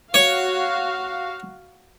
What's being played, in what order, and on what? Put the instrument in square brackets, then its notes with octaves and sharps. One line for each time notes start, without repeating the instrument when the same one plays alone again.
[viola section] F#4 F5 [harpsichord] C#5